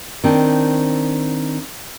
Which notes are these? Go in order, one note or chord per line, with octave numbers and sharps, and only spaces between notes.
D#3 C4 D4